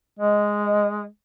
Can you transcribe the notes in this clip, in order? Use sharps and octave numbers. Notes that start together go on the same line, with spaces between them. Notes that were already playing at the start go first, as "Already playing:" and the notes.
G#3 D#5